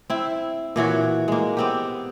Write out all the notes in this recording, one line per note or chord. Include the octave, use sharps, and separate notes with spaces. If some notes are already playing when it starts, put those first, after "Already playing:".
C4 E4
A#2 E3 F#4 C#5
G#3 A#3
B3 C4 G4